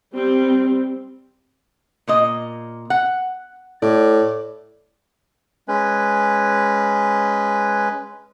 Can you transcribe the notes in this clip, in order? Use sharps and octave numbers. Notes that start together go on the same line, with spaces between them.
G3 C4
A#2 A#3 D#5
F#5
A2 D5
G#3 C#4 B4